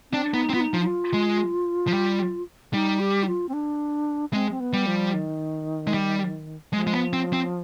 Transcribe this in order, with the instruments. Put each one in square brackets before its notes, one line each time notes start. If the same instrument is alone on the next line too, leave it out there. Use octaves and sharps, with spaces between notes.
[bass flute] C4 [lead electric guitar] D4
[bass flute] D4
[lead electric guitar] B3 [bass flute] D#4
[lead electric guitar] C4
[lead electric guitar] B3 [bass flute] F4
[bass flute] D#4
[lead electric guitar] F3
[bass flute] D#4
F4
[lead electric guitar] G#3
F3
G3
[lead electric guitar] G3 [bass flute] D#4
[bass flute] G4
D#4
F4
C4
D4
[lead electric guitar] G#3 [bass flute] C4
[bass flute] C4
B3
[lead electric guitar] G3
[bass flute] F3
D#3
[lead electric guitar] G#3
G3
[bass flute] F3 [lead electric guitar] G#3
[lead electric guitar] G#3
B3
C4
C4